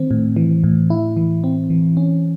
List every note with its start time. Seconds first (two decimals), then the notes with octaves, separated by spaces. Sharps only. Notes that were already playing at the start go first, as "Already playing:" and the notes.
Already playing: D#3 C4
0.11 A2
0.36 E3
0.64 A2
0.90 E4
1.17 E3
1.44 C4
1.70 E3
1.97 C#4